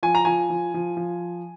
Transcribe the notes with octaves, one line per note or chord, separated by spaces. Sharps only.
F3 G#5
A#5
F3 G#5
F3
F3
F3